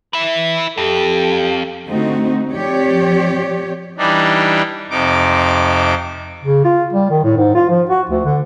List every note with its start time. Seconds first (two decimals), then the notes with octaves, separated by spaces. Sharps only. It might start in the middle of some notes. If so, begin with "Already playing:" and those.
0.13 E4 B4
0.77 F2 G4 A4
1.89 D3 A3 C4 D#4 F#4
2.51 F3 C4 G4 C#5 D5
3.98 E3 G3 D4 D#4
4.90 F2 C3 D#4 D6
6.44 C#3
6.65 F4
6.93 G3
7.10 D#3
7.24 A2
7.37 G#2
7.55 F4
7.70 F3
7.89 F#4
8.10 D2
8.25 D3